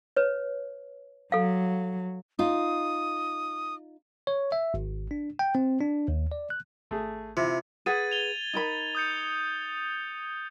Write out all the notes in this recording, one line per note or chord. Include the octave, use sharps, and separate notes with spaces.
B4 C#5
F#3 A4 F5
D#4 F4 D#6
C#5
E5
G#1
D4
G5
C4
D4
D#2
D5
F#6
G#1 A3 G#4
C3 E4 F4
G#4 B4 F#5 G#6 A6 D#7
F7 G7
D#4 A#4 B5
D#6 G6 C#7